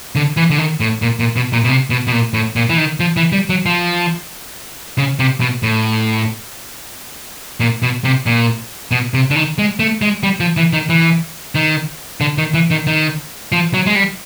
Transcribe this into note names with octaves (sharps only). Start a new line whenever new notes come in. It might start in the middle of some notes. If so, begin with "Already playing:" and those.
D3
E3
D3
D#3
A2
A#2
A#2
B2
A#2
B2
C3
B2
B2
A#2
A2
A#2
E3
D#3
F3
E3
G3
F#3
F3
C#3
C3
B2
A2
A#2
B2
C3
A#2
B2
C3
D3
D#3
G#3
A3
G#3
G3
F3
E3
D#3
E3
D#3
D3
D#3
E3
D#3
D#3
F3
F#3
G#3
G3